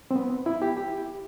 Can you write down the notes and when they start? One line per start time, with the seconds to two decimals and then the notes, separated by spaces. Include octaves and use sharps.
0.11 C4
0.16 B3
0.46 E4
0.62 G4
0.77 G4